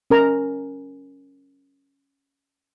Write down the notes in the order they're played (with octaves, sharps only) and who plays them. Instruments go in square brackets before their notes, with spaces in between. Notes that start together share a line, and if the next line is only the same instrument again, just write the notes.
[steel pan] C#4 A#4 A#5